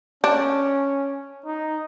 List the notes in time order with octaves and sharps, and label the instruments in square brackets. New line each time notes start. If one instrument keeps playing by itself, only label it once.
[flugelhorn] C#4 [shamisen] D4
[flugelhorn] D#4